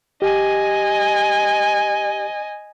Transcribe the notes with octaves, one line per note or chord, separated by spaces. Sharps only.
G4 D#5 G#5